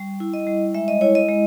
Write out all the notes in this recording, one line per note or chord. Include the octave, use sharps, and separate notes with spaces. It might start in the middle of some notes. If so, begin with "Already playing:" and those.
Already playing: G3
E4
D#5
G3
G#3 E5
D#5
E4 C#5
D#5
G#3